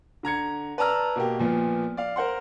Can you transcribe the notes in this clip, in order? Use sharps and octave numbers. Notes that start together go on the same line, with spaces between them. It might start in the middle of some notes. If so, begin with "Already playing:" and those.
D3 A#5 G#6 C#7
B4 D5 A5 A#5 E6 F6
B2 A#3 G4
A#2 F3 B3
D5 F5
A#4 C5 F#5 C6